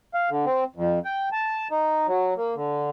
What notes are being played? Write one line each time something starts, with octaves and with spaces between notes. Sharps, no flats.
F5
D3
C4
F2
G5
A5
D#4
F#3
A#3
D3